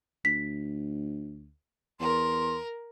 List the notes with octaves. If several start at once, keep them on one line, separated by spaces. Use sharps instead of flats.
D2 B6
E2 A#4 C6